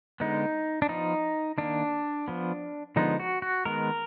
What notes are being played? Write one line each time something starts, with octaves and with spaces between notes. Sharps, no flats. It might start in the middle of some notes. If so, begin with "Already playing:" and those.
D3 G#3 B3 D#4
D4
F3 B3 D#4
D#3 A#3 D4
F3 B3
D3 F3 G#3 B3 D#4
F#4
F#4
D#3 G#3 B3 A#4